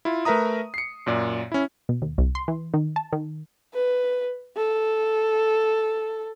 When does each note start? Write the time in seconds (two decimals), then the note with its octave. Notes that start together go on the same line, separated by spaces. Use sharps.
0.05 E4 F4
0.25 A3 A#4 B4 E5 A#5 D#6
0.74 C7 C#7
1.06 F#2 A#2 D5
1.52 C#4 E4
1.89 B2
2.02 D#2
2.18 C2
2.35 C6
2.48 E3
2.74 D#3
2.96 A5
3.13 D#3
3.74 B4
4.57 A4